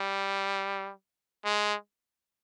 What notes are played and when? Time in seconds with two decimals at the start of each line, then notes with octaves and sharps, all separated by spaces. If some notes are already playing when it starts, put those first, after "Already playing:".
Already playing: G3
1.44 G#3